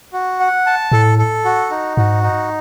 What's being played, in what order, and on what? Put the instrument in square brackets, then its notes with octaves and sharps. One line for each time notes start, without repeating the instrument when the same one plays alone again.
[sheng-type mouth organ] F#4
F#5
A5
[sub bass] A2 [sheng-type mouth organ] A4
[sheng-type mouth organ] A4
F#4
D#4
[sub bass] G#2 [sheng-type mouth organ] F#4
[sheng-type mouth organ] D#4